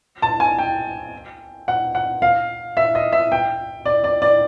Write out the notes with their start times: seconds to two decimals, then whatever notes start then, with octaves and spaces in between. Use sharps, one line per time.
0.22 A5
0.40 G#5
0.58 G5
1.68 F#5
1.95 F#5
2.22 F5
2.77 E5
2.95 D#5
3.12 E5
3.32 G5
3.86 D5
4.04 D5
4.22 D5